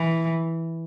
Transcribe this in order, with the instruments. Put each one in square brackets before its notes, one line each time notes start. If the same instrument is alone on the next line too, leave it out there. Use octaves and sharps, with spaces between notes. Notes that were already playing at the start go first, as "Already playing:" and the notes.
Already playing: [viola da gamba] E3